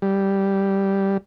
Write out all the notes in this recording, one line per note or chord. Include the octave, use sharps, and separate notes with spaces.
G3